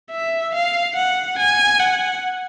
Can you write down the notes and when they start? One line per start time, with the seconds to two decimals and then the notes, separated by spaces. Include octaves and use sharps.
0.11 E5
0.54 F5
0.96 F#5
1.39 G#5
1.80 F#5